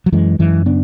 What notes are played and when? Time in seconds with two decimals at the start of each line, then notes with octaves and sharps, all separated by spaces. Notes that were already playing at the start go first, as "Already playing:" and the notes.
0.06 F#3
0.12 F#2 E3 G#3
0.39 F#2 E3 G#3
0.66 C#3 B3 D4